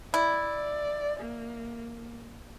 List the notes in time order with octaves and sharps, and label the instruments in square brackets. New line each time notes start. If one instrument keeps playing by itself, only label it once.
[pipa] E4 [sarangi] D5
[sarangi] A#3